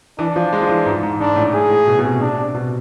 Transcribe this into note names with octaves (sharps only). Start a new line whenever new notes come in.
E3 D4
F3
G#3
F3
E3
G#2
G#2
G#2 D4
A2
A2 G#4
A2
B2
B2
C3
C3 D4
C3
B2